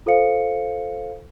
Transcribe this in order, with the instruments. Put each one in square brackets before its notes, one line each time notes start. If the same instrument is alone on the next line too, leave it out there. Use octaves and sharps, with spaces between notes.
[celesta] F4 A4 C5 F5 C#7